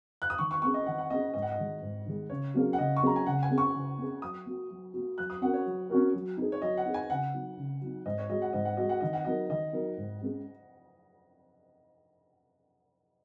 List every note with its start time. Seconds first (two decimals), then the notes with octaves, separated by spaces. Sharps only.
0.22 F#6
0.30 D#6
0.38 D#3 C#6
0.51 C#6
0.62 A#3 C#4 G#4 C#6
0.74 D#5
0.86 D#3 F#5
0.98 F#5
1.10 A#3 C#4 G#4 D#5
1.34 G#2 D#5
1.42 F#5
1.51 D#5
1.58 D#3 G#3
1.82 G#2
2.06 D#3 G#3
2.30 C#3 C#5
2.54 F#3 A#3 C#4 G#4
2.73 F#5
2.78 C#3 D#5
2.97 C#6
3.02 F#3 A#3 C#4 G#4 A#5
3.16 G#5
3.26 C#3 F#5
3.43 G#5
3.50 A#3 C#4 G#4
3.58 C#6
3.74 C#3
3.98 A#3 C#4 G#4
4.22 F#3 D#6
4.46 A#3 F#4
4.70 F#3
4.94 A#3 F#4
5.18 F#3 F#6
5.30 D#6
5.42 C#4 F#4 A#4 F#5
5.54 C#5
5.65 F#3
5.90 C#4 F#4 A#4
6.14 F#3
6.37 D#4 G#4
6.52 C#5
6.62 F#3 D#5
6.77 F#5
6.86 D#4 G#4
6.94 G#5
7.10 C#3 F#5
7.34 F#3 D#4
7.57 C#3
7.81 F#3 D#4
8.06 G#2 D#5
8.18 C#5
8.30 G#3 F#4 D#5
8.42 F#5
8.53 G#2 D#5
8.65 F#5
8.77 G#3 F#4 D#5
8.89 F#5
9.01 D#3 D#5
9.13 F#5
9.24 F#3 D#4 A#4 D#5
9.50 D#3 D#5
9.73 F#3 D#4 A#4
9.97 G#2
10.21 G#3 C#4 G#4